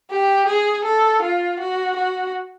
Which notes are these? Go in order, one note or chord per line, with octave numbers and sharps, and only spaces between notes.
G4
G#4
A4
F4
F#4
F#4